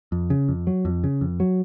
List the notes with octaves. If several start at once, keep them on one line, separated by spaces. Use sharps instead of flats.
F2
C#3
F2
F#3
F2
C#3
F2
F#3